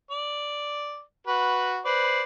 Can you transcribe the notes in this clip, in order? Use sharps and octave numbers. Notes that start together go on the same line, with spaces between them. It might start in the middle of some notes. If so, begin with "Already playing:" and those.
D5
F#4 B4
B4 C5 D5